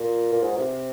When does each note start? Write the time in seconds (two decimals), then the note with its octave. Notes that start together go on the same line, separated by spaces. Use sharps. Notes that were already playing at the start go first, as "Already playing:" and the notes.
Already playing: A#2
0.32 A#2
0.43 G#2
0.57 C3